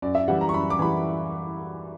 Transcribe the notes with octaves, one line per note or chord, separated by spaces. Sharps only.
F#2 D5
E5
E3 G3 F#5
A#5
C#6
F#2 B5
D6
E3 G3 B5